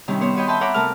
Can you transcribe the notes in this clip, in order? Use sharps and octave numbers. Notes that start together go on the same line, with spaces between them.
C3 D#3 G3 C#4
B3 C5 C#5
F#4 B4 C#5 D#5 G5
E5 G5 A5 B5 C6
C#5 E5 F#5 A#5 B5 D6
C3 A3 A#4 A5 F6